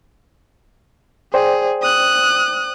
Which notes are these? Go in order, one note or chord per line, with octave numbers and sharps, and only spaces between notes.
G#4 C5 D5 G5
D#6 F#6